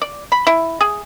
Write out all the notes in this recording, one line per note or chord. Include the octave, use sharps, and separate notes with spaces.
D5
B5
E4
G#4